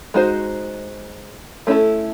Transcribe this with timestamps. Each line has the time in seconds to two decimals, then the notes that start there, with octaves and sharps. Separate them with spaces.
0.14 G#3 D#4 F#4 A4 C5
1.67 A3 C#4 E4 A4